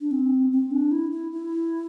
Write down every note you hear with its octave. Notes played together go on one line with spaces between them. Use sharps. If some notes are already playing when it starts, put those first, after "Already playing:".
D4
C4
C4
D4
E4
E4
E4